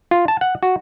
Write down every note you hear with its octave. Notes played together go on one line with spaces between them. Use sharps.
F4
A5
F#5
F#4